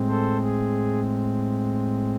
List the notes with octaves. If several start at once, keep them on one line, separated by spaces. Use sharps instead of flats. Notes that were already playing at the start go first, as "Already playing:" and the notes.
Already playing: A2 G#3 C4
A4 C5
G#4